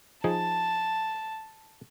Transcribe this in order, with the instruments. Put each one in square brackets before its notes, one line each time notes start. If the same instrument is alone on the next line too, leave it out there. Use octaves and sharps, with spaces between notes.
[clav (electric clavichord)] F3 D#4 G#4 [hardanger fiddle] A5